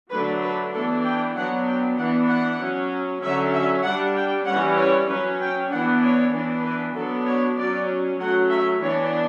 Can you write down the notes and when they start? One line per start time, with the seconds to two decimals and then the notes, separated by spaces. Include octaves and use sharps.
0.11 D3 F#3 A3 D4 B4
0.42 B4
0.73 E3 B3 D4 A4
1.05 G5
1.36 F#3 B3 D4 F#5
1.67 G5
1.98 E3 B3 D4 F#5
2.29 F#5
2.60 F#3 C#4
3.22 D3 F#3 C#4 E5
3.54 E5
3.84 G3 D4 F#5
4.15 G5
4.46 E3 G3 C#4 F#5
4.78 C#5
5.08 F#3 C#4 B4
5.40 G5
5.71 E3 B3 D4 F#5
6.02 C#5
6.33 E3 B3 D4
6.64 B4
6.95 F#3 B3 D4 A4
7.26 C#5
7.58 F#3 C#4 D5
8.20 F#3 A3 C#4 F#5
8.51 E5
8.81 E3 B3 D4 C#5